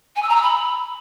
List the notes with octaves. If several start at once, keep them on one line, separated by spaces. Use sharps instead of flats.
G#5
E6
A#5
E6
B5